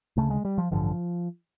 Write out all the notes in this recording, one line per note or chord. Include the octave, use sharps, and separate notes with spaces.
D2 C#3 A3
G#3
G3
F3
A1 G2 D3 F3